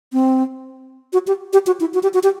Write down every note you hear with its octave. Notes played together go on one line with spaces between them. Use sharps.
C4
F#4
G4
G4
F#4
E4
F#4
G4
F#4
G4